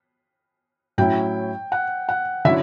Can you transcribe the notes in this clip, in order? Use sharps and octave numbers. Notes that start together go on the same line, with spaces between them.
A2 F#3 C#4 E4 G5
F#5
F#5
D3 F#3 C#4 E4 E5